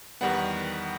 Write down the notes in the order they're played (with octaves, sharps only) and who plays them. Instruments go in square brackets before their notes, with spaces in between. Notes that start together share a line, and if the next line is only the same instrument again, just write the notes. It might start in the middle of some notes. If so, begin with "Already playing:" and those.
[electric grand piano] E2 D#3 G3 B3 F#5